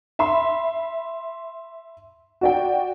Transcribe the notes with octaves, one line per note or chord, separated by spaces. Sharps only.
E5 B5 C6
F#4 D5 G5